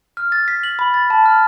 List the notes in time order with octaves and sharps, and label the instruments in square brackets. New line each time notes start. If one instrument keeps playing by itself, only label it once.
[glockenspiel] F6
A6
B6
F#7
B5
A6
A5
F6